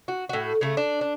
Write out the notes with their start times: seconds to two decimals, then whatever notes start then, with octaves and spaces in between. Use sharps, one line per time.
0.08 F#4
0.29 A2 F#4
0.61 C#3 A3
0.77 D4
1.01 D4